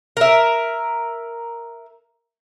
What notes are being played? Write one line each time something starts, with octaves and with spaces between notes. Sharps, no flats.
A#4 E5